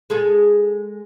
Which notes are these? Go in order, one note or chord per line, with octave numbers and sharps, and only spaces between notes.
G#3 G#4 A4